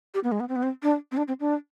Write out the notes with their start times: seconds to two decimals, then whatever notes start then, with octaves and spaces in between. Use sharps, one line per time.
0.14 G4
0.24 B3
0.32 G#3
0.40 B3
0.49 C4
0.56 B3
0.63 C4
0.83 D4
1.12 C4
1.17 D4
1.28 C4
1.40 D4